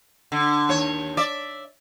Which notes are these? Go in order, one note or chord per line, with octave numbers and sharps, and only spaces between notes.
D3
D#2 C#5
D5 E5